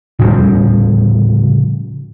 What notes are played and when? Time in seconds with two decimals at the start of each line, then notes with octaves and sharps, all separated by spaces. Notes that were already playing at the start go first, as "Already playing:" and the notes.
0.19 A2 C#3 F3 G3